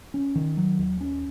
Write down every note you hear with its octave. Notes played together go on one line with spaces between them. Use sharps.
C#4
D#3
F#3
D#2
C#4